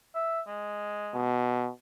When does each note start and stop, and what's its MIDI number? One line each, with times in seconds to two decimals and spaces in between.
0.15 0.40 76
0.47 1.30 56
1.15 1.70 47